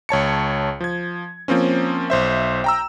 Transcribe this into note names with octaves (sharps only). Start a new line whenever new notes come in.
C#2 C#5 A5 C#7
F3 G#6
F3 A#3 C4 C#4
B1 C5 E5
G5 A#5 E6